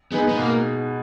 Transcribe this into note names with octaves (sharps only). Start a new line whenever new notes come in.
G#3 B3 D#4 G#4 B4
B3
B2 A#3